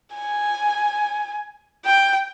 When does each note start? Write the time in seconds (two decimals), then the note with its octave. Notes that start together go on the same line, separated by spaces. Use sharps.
0.14 G#5
1.85 G5